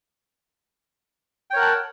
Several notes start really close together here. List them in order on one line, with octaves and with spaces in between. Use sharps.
G5 C#5 A#4 F#5 A5